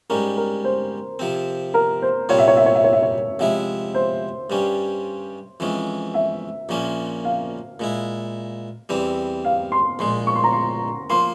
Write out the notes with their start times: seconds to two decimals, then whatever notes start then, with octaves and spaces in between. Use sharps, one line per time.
0.10 G#2 G3 C#4 A#4
0.37 A#4
0.64 C5
1.19 C3 F3 C4
1.74 A#4
2.02 C5
2.29 C2 A#2 G3 C4 F4 C#5
2.39 E5
2.48 C#5
2.57 E5
2.66 C#5
2.75 E5
2.84 C#5
2.93 E5
3.03 C#5
3.39 C3 F3 G#3 E4 E5
3.94 C5
4.50 G2 G3 C#4
5.60 F2 E3 G#3 C#4
6.14 E5
6.69 A#1 A#2 F3 A#3 C#4
7.25 F5
7.80 A#2 G#3 E4
8.89 E2 E3 G3 C4
9.45 F5
9.72 C6
9.99 A#1 A#2 G#3 C6
10.27 C#6
10.35 C6
10.44 A#5
10.53 C6
11.10 F3 A#3 C6